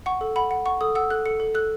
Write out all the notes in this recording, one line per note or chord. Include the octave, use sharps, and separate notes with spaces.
F#5 C#6
A4
F#5 B5
F#5
F#5 C#6
A4 D#6
F#5 E6
A4 F#6
A4 C#7
A4
A4 F#6